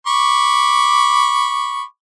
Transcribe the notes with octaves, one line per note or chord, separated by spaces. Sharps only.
B5 C#6 D6